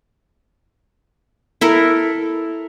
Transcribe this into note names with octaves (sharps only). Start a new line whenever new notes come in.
E4 A4 A#4